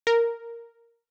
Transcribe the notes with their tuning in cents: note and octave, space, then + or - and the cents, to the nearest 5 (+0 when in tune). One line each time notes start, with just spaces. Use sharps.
A#4 -5